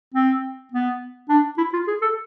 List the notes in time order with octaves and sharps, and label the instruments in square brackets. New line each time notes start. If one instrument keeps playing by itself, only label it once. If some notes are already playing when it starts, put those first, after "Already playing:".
[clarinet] C4
B3
D4
E4
F4
G#4
A4